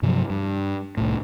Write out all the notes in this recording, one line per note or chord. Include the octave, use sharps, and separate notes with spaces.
G2 C3 F3 F#3
G2
C2 A2